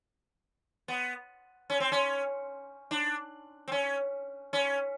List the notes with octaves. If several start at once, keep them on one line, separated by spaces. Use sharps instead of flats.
B3
C#4
C4
C#4
D4
C4
C#4
C#4